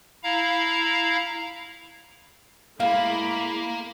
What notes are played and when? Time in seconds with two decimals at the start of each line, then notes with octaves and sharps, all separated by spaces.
0.23 E4 F5 A#5
2.80 A2 G#3 A#3 F5 B5